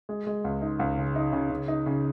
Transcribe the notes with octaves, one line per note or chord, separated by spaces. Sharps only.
G#3
G#3
C#2
D#4
C#2
C#3
D#4
C#3
C#3
D#4
C#3